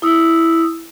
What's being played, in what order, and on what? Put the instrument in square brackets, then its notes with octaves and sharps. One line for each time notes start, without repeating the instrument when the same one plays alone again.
[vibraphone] E4 D#6 E6